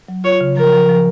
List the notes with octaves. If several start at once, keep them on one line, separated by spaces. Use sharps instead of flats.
F#3
F4 C#5
C#3
F3 A#4
F3
F3